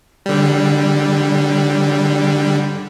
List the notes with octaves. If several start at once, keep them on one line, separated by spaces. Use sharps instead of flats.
D3 G3